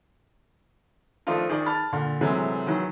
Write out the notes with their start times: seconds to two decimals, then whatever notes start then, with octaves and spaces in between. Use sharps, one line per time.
1.27 D#3 F3 A3 D4 D#4 F4
1.49 D#3 G#4 D5
1.66 A5 B5 F6 A6
1.92 A#2 D3
2.21 C3 E3 F#3 G#3 A3
2.67 D#3 E3 F#3